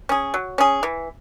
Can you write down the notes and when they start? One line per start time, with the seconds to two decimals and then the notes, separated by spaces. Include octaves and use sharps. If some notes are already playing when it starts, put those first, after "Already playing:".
0.09 C#4 G#4
0.34 F#3
0.58 C#4 G#4
0.83 E3